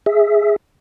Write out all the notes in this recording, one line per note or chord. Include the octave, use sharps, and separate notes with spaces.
G#4 E5